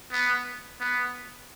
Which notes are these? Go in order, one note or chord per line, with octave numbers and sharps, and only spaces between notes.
B3
B3